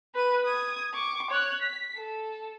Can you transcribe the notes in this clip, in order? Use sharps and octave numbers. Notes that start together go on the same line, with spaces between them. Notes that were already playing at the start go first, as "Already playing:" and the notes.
B4 D#7
D#6 G#6
C#6 D6
C#5 F#6
B6
A4